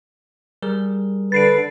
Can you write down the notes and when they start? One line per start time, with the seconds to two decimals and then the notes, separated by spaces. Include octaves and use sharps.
0.63 G3 G#4 A#4
1.32 D3 B4 A6 C7 D7